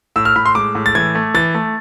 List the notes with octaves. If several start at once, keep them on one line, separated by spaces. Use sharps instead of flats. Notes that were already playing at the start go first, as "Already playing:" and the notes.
A2 E6
F6
A2 B5
C6
G#3 D6
A2
A6
E3 G#6
A3
E3 A6
A3